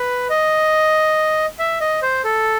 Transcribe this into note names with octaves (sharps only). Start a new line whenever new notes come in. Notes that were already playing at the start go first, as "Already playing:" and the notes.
Already playing: B4
D#5
E5
D#5
C5
A4